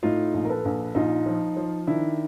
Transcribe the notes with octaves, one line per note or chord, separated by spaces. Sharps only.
A2 D#4 F4
A#1
A#4
A4 B4
A#1
A#1 D#4 F4
F3
F3
D#3 D4 E4